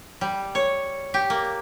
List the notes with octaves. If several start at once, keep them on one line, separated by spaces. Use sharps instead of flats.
G3
C#5
G4
A#3